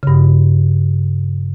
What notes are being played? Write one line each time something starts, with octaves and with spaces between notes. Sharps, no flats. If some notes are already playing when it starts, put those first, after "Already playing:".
G2 C#3